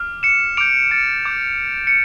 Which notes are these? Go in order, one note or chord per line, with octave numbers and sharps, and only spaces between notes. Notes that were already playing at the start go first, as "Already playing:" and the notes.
Already playing: D6 F6
C#7 E7
D6 G6 D7 F7
A6 C#7
D6 G6
C#7